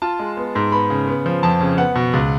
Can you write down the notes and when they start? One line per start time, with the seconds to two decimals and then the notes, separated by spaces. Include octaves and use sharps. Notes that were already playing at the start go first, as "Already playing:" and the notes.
0.02 F4 A5
0.19 G#3
0.37 B3
0.55 G#2
0.72 B3 B5
0.90 C#3
1.07 B3
1.26 F3
1.43 F2 A5
1.61 C#3
1.77 B3 F#5
1.95 B2
2.13 C#2